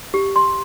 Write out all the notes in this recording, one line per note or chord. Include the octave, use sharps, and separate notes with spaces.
G4
C6